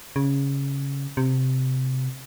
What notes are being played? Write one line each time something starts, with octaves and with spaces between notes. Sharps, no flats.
C#3
C3